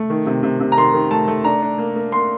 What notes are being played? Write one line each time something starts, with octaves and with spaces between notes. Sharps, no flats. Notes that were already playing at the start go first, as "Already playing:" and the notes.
Already playing: A3
D#3
C3
C3
C3
A#5
D#3 C6
D#3
A3 A5
A3
D4 A#5
D4
A#3
A#3
A#3 C6